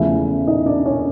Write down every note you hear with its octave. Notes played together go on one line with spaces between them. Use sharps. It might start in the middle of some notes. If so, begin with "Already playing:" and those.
Already playing: E2 C#3 F3 A3 E4 E5
D#4 D#5
D4 D5
C#4 C#5